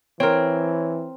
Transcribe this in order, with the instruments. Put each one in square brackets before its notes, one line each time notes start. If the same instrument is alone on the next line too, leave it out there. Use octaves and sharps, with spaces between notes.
[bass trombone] E3 [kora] C4 A#4 [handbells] C#5